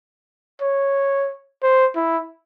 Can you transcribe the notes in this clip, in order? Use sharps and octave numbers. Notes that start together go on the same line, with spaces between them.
C#5
C5
E4